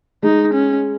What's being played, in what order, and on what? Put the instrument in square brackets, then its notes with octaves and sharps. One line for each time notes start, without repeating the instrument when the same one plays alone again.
[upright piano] G#3 [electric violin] D#4
[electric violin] C#4